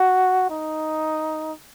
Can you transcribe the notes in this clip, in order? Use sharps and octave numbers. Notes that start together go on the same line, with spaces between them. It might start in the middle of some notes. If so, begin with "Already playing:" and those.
Already playing: F#4
D#4